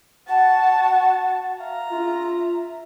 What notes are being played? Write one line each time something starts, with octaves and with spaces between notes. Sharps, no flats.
F#4 F#5 A5
E5 F5 A#5
F4 E5